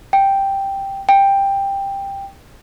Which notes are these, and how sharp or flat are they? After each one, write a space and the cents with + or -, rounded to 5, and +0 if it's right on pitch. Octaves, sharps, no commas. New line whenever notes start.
G5 +0
G5 +10